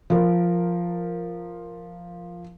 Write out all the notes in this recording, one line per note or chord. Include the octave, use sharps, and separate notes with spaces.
F3 A#4